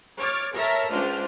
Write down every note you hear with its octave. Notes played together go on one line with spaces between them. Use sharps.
C#5 D6 F6 A6
A4 A#4 C#5 E5 A5 A#5
C#2 G#3 D4 F4 C5 F6